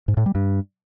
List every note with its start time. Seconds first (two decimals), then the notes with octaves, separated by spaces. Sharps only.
0.08 G#2
0.17 A2
0.26 G3
0.35 G2